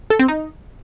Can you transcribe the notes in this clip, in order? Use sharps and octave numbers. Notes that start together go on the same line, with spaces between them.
A4
C4
D#4